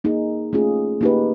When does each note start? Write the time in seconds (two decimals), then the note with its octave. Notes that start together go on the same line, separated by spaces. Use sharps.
0.04 A#3 D#4 G#4
0.53 A3 C#4 F4 G#4
1.01 A#3 D#4 G4 B4